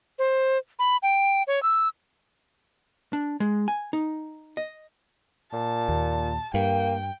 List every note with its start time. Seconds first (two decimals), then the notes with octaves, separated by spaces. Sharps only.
0.19 C5
0.79 B5
1.03 G5
1.47 C#5
1.63 E6
3.13 D4
3.40 G#3
3.68 G#5
3.93 D#4
4.57 D#5
5.53 A#2 A5
5.88 D#2
6.54 G2 A#3 G5